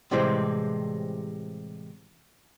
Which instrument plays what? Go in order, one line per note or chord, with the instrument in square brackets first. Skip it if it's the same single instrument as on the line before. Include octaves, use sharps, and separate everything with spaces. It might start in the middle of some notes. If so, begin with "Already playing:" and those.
[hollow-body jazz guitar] A2 C3 E3 G3 G#3 C4